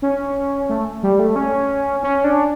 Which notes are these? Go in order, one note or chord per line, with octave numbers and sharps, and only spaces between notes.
C#4
A3
G3
A3
C#4
C#4
D4